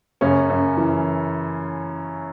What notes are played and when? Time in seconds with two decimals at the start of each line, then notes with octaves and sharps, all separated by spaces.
0.21 F#2 C#3 C#4
0.49 F#2
0.77 E3